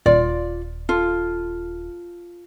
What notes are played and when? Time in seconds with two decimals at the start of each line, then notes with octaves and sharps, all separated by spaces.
0.06 D#1 F4 D5
0.89 F4 A4